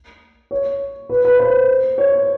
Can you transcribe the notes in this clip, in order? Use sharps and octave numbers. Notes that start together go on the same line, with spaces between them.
C#5
B4
B4
C5
C#5